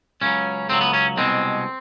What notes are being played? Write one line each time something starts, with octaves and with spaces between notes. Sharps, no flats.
C#2 C#3 F#3 C#4
C#2 C#3 F#3 C4
B3
C#4
C2 B2 G#3 C4